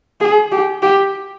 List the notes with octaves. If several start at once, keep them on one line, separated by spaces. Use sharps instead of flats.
G#4
G4
G4